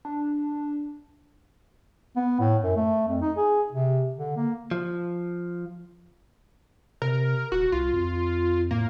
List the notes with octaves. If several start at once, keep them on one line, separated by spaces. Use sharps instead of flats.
D4
B3
A2
F#2
A3
F2
D#4
G#4
C3
D3
A#3
F3
C3 A#4
D#1 F#4
C2 F4
F2
A2 A#3